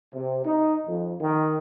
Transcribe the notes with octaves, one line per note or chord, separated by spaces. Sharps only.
C3
D#4
F2
D#3